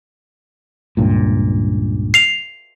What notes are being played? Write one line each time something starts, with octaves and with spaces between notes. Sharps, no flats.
C#2 G2 A#2
C7 F7